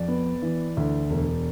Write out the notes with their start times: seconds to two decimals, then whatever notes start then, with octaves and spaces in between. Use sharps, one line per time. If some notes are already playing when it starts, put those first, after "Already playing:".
Already playing: F2 D5
0.08 B3
0.42 E3
0.77 D2
1.10 E1